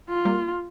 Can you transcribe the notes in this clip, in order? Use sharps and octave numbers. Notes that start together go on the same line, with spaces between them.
F4
G3 A#3